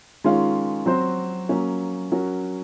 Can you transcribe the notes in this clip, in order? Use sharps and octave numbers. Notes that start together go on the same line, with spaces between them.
D#3 G#3 C#4 F4
F#3 C4 F#4 C5
F#3 A#3 C#4
F#3 C#4 F#4 A#4